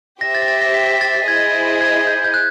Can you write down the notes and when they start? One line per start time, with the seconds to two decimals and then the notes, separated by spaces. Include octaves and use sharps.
0.21 G4 C5 E5 A#6
0.35 A6
0.42 A#6
0.48 A6
0.62 A#6
0.74 B6
0.88 B6
1.01 A6
1.15 A6
1.27 E4 G#4 C5 D#5 G#6
1.81 G#6
2.07 G6
2.24 G6
2.34 F#6